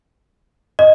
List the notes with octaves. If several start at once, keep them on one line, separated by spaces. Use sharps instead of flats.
D#5